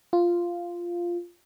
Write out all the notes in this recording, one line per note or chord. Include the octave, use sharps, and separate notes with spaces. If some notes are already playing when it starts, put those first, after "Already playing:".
F4